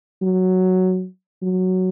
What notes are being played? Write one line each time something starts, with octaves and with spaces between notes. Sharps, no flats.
F#3
F#3